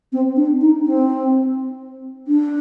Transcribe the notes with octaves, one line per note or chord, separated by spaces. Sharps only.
C4
D4
D#4
C4
D4